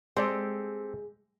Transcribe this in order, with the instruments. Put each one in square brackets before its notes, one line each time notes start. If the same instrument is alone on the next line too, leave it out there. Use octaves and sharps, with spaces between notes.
[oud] G#3 [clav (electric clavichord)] C4 G4 A4 [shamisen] C5 D5